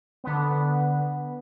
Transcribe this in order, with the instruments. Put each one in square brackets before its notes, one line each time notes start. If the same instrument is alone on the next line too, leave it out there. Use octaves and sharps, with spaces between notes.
[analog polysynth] D3 B3